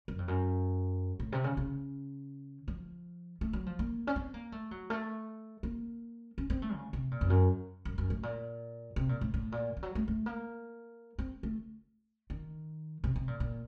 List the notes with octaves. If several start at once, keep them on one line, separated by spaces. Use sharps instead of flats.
F#2
F2
F#2
A2
C3
C#3
C#3
F3
A3
F#3
F3
A#3
C#4
C4
A#3
A3
F#3
A3
A#3
C#4
C4
A3
C#3
C3
A#2
F2
F#2
F#2
F#2
A2
A#2
C3
A#2
A2
A2
A#2
F3
F#3
A3
A3
A#3
C4
A3
D#3
C3
C3
A#2
A#2